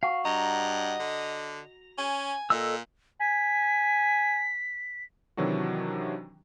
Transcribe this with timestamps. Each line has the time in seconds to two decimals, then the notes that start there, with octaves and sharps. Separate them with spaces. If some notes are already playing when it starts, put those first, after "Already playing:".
0.03 F#4 F5
0.25 G2 D#5 A#5
1.00 D3
1.98 C#4 G#5
2.50 A#2 A4 D#5 E6
3.20 G#5 B6
5.37 C3 D#3 E3 F#3 D4 F#4